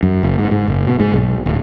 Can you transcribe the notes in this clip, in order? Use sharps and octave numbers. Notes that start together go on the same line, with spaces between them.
F#2
F#1
G#2
G#2
F#1
B2
G#2
B1
D1